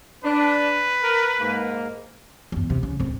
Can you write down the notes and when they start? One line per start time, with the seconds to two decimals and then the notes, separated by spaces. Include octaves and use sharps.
0.24 D4 B4
1.02 A#4
1.40 G#2 A#3
2.52 E2 G2
2.70 C3
2.83 C#3
3.00 D1 C4